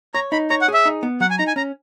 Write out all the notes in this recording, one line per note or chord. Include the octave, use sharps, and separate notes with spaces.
C#5 A#5
D#4 B5
C#5 A#5
F#5
G#4
E5
D#4
B3
F#3 F#5
G#5
D#4 A#5
G#5
C#4 A#5